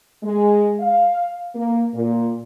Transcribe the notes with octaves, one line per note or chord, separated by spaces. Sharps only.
G#3
F5
A#3
A#2